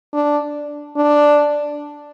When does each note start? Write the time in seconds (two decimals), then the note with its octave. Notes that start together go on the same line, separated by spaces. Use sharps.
0.13 D4
0.97 D4